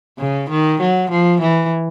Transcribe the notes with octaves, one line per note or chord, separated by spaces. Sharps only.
C#3
D#3
F#3
F3
E3